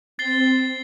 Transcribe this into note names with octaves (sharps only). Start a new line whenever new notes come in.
C4 A6 C7 G7